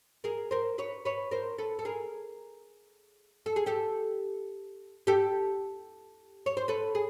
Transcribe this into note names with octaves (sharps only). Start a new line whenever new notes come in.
G#4 A#4
A#4 C5
B4 C#5
B4 C#5
A#4 C5
A4 B4
A4
G#4 A#4
A4
G#4
G4 A4
G4 A4
C#5
C5
A4 B4
G#4